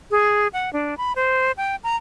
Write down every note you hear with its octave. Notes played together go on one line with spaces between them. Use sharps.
G#4
F#5
D4
B5
C5
G5
A#5